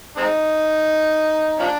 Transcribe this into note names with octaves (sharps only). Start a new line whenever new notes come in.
G#3 C4 D#4
F3 A#3 D4